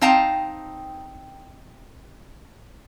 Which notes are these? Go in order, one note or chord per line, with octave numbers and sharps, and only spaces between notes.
C4 D#4 F5 G5 A5 A#5